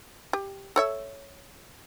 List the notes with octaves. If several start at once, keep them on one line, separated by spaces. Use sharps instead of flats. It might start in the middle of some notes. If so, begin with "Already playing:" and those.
G4
A4 C#5 E5